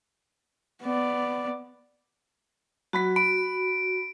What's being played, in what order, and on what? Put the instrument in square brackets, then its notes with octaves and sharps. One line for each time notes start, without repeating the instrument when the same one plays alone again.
[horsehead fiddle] B3 D5
[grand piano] F#3 B5 B6 [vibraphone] F#4
[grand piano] B5 [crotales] D7